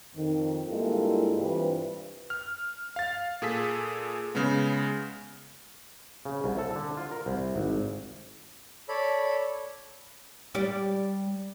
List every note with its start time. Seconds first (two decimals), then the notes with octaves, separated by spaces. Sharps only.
0.15 F2 D#3
0.68 G2 G#3 A#3 E4 F4 A4
1.38 G2 C3 E3 F4 B4
2.30 F6
2.96 F5 A6
3.42 A#2 G#4 A4 B6
4.35 C#3 G#3 B3
6.25 C#3
6.44 C2
6.58 A4
6.75 D3
6.97 F4
7.11 A#4
7.26 C2
7.56 G#1
8.89 A4 C#5 D5 B5
10.55 G3 D5